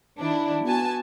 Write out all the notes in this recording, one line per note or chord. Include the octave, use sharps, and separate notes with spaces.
D#3 D4 E4
B3 F#4 G#5 A5